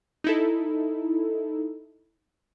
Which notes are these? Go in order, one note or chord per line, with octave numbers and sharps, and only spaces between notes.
D#4 E4 A4